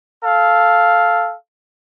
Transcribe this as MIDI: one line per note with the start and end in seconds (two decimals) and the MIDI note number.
0.24 1.33 69
0.24 1.33 77